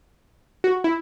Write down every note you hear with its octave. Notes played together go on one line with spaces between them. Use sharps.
F#4
E4